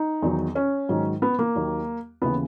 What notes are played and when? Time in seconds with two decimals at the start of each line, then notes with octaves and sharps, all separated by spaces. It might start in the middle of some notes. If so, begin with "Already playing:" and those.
Already playing: D#4
0.22 E2 D#3 F#3
0.55 C#4
0.89 G#2 D#3 F#3
1.22 B3
1.39 A#3
1.55 D#2 D#3 F#3
2.22 D#2 C#3 E3 B3